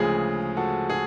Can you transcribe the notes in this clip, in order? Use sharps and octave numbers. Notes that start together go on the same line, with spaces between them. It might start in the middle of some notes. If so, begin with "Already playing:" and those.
Already playing: D2 C#3 F3 G#3 G#4
F#4 A4
G#4